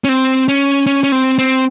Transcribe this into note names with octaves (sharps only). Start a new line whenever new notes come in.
C#4
C4
C#4
C#4
C#4
C4
C4